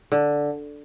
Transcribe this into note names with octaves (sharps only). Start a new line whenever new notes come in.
D3